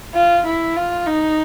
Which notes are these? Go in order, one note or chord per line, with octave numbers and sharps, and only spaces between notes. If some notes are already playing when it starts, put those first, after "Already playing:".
F4
E4
F4
D#4